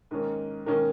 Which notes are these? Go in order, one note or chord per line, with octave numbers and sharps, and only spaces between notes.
G#2 D#3 A#3 C#4
G#2 D#3 A#3 C#4